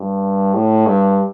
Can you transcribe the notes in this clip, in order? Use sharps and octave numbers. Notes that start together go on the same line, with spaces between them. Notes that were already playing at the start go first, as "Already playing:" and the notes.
Already playing: G2
A2
G2